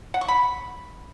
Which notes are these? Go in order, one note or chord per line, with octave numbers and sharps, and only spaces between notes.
F#5
C#6
B5